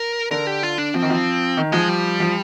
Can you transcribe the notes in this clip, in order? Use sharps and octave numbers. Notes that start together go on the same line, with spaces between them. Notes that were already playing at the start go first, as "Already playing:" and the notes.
Already playing: A#4
D3 A#4
G4
F4
D4
F3 C4
D#3
F3
D#3
F3 G#3
G3
F3